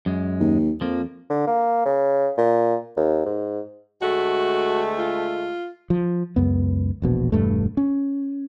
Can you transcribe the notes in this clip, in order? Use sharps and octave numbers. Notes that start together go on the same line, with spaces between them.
F#2 G#3
D#2
F2 F3 A#3
D3
A#3
C#3
A#2
D#2
G#2
D2 G#3 A3 F#4
F4
F3
C#2 F#2 B3
E1 A#1 B2
E1 G2 A3
C#4